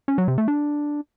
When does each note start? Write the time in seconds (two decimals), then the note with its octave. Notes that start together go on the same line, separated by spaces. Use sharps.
0.08 C#4
0.18 F#3
0.28 C3
0.38 A3
0.48 D4